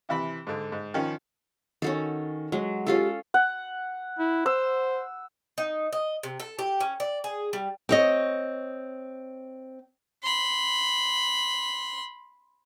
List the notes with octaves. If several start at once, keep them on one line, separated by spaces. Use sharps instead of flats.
C3 E3 B5
G#2 D3
G#2
D#3 F3 C#4
D#3 C#4 F#4 A4
F#3 G#3
C#4 F4 G4 A4
F#5
E4
C5 E6
D#4
D#5
C3
A4
G4
C#4
D5
G#4
G3
C4 C#5 D#5
B5 C6